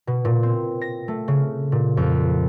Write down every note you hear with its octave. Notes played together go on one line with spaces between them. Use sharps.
B2
A#2
C4
A#6
A3
C#3
A#2
F2